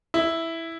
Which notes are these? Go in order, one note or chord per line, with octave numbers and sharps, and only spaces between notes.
E4